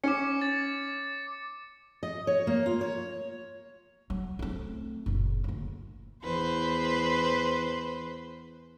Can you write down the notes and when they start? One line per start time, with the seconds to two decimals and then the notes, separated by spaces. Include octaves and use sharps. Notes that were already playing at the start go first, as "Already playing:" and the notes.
0.04 C#4 D6 C#7
0.42 A6
2.03 D#5
2.27 C#5
2.47 A#3
2.66 F4
2.81 C#5
4.10 F#3
4.39 A3 C4
5.06 F#1 A#2
5.44 D2 A#3
6.23 E2 B4 C5